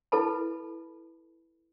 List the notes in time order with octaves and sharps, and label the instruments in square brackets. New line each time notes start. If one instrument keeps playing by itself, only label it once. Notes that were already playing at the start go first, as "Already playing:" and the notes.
[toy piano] E4 A4 B4 A5 B5